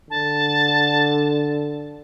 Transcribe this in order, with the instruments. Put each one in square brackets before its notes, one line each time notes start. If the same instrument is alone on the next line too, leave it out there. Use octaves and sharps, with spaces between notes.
[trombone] D3 [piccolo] A5